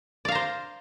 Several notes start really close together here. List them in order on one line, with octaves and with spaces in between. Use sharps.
D5 F5 A#5 C5